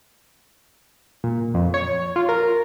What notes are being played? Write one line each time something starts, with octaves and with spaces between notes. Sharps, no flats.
A#2
F2
C#5
F4
A#4